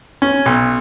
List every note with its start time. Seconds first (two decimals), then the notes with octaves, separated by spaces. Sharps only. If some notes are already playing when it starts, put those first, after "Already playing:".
0.22 C#4
0.46 B1